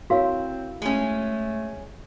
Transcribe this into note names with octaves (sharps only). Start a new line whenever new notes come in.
C4 E4 F#4 A#4 C#5 F5
G#3 A3 C#4